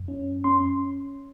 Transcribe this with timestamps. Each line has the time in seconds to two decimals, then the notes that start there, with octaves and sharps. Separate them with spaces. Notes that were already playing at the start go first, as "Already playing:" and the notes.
Already playing: F#2
0.08 C#4
0.44 C#4 C6